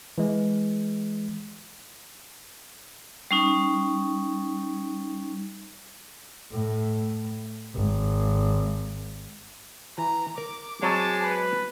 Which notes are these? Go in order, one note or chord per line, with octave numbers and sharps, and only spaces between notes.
E3 G#3
G3 C#4 D#4
A2
G#1
E3 A#5
A#4 D6
F#3 G#3 C4 C#5 A5
B4